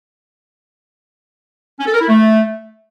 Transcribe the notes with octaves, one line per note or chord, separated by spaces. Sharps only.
C#4
A4
A#4
E4
A3